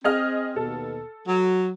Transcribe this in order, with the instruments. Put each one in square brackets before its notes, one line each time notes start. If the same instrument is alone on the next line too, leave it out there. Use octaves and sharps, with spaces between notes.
[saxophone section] C4 [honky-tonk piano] G#4 D#5 F6
[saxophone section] D#2 B2 [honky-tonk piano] A4
[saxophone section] F#3